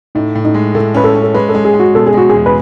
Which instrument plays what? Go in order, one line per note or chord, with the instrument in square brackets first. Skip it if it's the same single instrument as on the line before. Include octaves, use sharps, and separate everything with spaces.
[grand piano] A2 [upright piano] D#4
[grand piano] A2
[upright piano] D#4
[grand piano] G#3
[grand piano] A2 [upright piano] A4
[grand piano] C#4 [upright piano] B4
[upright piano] A4
[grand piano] C#4
[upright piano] A4
[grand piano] G#3 [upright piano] B4
[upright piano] A4
[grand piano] G#3
[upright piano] G#4
[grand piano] G#3
[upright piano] F#4
[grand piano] B2 [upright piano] A4
[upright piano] G#4
[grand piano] G#3 [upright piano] F#4
[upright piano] G#4
[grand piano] E2
[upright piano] B4